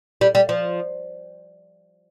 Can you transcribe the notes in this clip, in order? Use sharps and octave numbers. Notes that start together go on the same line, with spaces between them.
G3
G3
F3